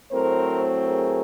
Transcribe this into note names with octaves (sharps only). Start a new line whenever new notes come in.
A2 F#3 A3 C4 A#4 C5
G#4 A#4